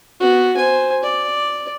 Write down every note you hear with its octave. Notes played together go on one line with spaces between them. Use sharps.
B3 F#4
C5 G#5
D5